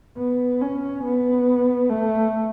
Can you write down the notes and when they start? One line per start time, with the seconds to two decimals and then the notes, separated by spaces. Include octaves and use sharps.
0.17 B3
0.61 C#4
1.04 B3
1.90 A3